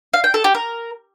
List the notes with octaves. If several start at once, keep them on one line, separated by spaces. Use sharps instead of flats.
F5
G5
A4
G4
A#4